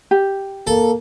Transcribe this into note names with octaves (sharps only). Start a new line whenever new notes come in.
G4
A#3 A4